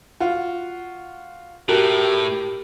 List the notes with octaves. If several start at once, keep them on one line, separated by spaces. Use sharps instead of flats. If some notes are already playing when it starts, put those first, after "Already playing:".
F4 F#4
A2 F#4 G4 A#4